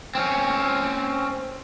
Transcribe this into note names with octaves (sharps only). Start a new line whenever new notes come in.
C4 C#4